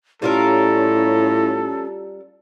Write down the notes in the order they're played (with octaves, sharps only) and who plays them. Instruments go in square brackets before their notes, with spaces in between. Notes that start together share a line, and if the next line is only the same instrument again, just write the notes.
[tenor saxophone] A2 [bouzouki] G3 F4 A#4 [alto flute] C#4 [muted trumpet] A4